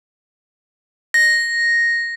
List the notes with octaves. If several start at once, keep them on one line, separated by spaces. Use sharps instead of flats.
A#6